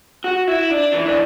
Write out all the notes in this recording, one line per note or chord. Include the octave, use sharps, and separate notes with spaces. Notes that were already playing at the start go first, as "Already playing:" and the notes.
F#4
E4
D4
E3
D4